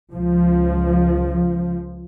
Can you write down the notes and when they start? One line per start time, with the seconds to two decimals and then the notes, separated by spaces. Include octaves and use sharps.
0.13 C#2 F3